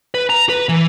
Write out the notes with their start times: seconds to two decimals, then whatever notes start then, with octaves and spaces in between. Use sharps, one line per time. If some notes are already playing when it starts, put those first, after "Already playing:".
0.14 B4
0.29 A#5
0.49 B4
0.69 E3